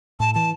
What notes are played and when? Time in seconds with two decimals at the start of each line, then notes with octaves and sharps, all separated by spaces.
0.20 A2 A5
0.35 E3 A5